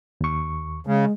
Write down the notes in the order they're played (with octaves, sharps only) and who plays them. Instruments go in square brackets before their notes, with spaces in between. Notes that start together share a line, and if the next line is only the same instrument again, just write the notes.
[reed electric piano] D#2 C#6
[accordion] C#3 [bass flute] G#3